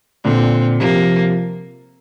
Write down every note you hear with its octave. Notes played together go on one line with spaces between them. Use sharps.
A#2 D3 C4
C3 F3 A#3